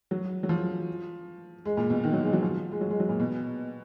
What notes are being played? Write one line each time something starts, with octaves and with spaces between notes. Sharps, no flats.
F#3
F#3
F3
G#3
A#2
B2
D#3
F#3
G#3
F#3
F3
G#3
F#3
G#3
F#3
A#2
B2